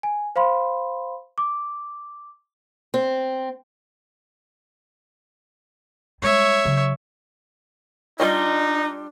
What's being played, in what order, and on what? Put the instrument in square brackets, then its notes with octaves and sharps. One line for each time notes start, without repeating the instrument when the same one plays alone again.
[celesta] G#5
C5 F5 B5 C6
D6
[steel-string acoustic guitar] C4
[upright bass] G3 G#3 [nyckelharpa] C#5 E5
[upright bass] C#3 F#3
[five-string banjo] G3 F4 D#5 [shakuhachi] D4 [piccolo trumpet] D#4